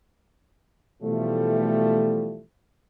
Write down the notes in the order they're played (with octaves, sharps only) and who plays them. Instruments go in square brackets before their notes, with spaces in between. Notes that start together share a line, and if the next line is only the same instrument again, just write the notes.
[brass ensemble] B2 E3 F3 G3 A3